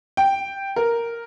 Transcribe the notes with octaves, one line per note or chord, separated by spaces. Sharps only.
G5
A#4